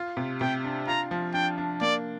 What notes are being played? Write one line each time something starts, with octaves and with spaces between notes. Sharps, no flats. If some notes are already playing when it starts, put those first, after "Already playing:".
Already playing: F4
C3
C3 G5
D4
F4 A#5
F3
D4 G5
D4
A#3 D5